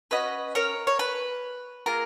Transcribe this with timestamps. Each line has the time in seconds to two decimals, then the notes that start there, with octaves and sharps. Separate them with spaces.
0.11 C#4 F#4 B4 D#5
0.55 A#4 C#5
0.87 C#5
0.99 B4
1.86 A#3 F4 G#4 A#4